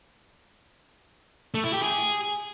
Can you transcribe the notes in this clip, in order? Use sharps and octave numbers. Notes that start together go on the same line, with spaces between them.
A3
E4
G4
G#4